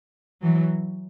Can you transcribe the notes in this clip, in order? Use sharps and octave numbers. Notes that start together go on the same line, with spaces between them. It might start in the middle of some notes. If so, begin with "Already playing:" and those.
E3 F#3